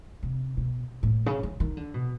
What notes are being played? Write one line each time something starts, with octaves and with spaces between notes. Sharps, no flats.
C3
B2
A2
C#3
D3
D#3
D3
B2